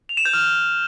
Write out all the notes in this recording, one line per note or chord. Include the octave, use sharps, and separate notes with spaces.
F7
E7
G6
F6